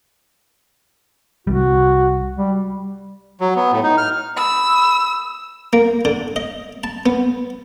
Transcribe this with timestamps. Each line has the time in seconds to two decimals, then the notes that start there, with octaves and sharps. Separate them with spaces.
1.47 C2 G3 F#4
2.37 G3
3.41 F#3
3.56 B3
3.72 A2
3.83 D#4
3.97 F6
4.37 B5 D#6 E6
5.73 A#3
6.05 D3
6.36 D#5
6.84 A5
7.06 B3